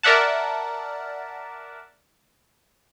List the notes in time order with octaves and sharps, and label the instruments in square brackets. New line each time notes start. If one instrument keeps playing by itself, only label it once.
[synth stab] A#4 D5 E5 F#5 A5